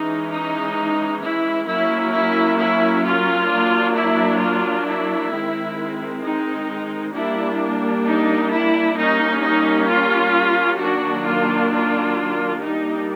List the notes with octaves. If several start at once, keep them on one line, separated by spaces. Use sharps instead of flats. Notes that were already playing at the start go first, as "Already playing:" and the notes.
Already playing: E3 G#3 C#4 D#4
D#4
E4
F#3 A#3 C#4 E4
E4
E4
F4
F#3 A#3 D4
E4
F4
E4
D#3 G#3 C4
D#4
G3 A#3 D4 E4
D#4
E4
G3 A#3 C#4 D#4
D#4
F4
D#3 F#3 A#3 D4 F#4
F4
F4
G3 A#3 D4 D#4